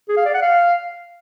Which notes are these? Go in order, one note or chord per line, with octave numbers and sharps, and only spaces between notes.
G#4
F5
D5
F#5
F5